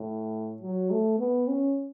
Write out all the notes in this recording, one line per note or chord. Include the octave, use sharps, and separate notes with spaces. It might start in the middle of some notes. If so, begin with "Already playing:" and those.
Already playing: A2
F#3
A3
B3
C#4